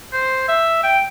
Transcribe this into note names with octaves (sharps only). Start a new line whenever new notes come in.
C5
E5
G5